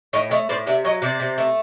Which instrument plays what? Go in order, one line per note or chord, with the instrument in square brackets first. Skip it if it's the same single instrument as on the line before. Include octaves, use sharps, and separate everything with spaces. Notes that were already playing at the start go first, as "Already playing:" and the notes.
[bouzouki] A2 C#5 D#5
A3 C#5 D#5
A2 C5 D5
C3 D5 E5
F#3 C#5 D#5
C3 C5 D5
C3
A3